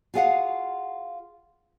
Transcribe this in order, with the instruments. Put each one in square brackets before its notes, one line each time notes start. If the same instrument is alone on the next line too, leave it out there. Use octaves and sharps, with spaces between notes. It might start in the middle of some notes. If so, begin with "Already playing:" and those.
[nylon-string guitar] F4 F#4 G#4 D5 F5 F#5